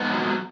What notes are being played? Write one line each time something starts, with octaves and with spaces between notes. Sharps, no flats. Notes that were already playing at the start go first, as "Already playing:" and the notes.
Already playing: G#2 B3
F#3